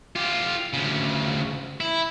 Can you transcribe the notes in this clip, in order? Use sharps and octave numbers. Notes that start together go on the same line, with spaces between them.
F4 G4
D2 C#3
E4